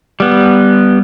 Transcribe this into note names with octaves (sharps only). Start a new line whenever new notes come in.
G3 B3